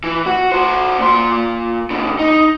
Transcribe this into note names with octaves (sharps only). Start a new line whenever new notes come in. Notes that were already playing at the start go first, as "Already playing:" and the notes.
E3
F#4
F#4 C5
A#2 C6
B2 D3
D#4